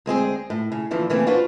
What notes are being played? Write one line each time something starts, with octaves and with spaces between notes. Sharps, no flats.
D2 G#3 C4 G#4
A2
C#3
A#2 D3 E3 F3
C#3 E3 A3 A#3 C4
D4 F4 F#4 B4 C5